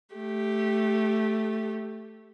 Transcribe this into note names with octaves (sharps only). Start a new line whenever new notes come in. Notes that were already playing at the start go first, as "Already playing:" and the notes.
A3 G4